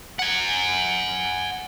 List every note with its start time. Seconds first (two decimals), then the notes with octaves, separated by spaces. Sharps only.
0.19 F#5 G#5